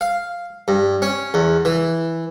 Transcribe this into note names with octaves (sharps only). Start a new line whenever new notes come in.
F5
G2
C#4
E2
E3